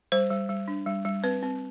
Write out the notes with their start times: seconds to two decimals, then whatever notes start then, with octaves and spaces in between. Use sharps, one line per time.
0.12 G3 C5
0.30 G3
0.49 G3
0.68 D4
0.86 G3
1.05 G3
1.24 C4 B4
1.43 C4